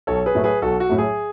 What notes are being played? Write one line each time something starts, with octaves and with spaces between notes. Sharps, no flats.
B1 A4 C#5
G#4 B4
A2 F#3 A3
G#4 B4
B1 F#4 A4
F#4
A2 F#3 A3
G#4